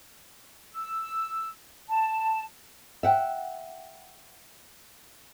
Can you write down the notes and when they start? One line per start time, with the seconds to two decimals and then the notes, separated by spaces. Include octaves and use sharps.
0.73 E6
1.89 A5
3.03 E5 F#5 G5